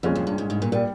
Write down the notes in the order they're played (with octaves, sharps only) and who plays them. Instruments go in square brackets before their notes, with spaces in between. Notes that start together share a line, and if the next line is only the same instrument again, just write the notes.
[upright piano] C2 A#2 G#3 C#4 F4 [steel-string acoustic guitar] F2
[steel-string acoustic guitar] F2
G2
G#2
G#2
A#2
[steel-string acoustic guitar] A#2 [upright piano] G3